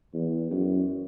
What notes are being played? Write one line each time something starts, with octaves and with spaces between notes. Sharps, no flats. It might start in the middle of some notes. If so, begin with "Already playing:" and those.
E2
F#2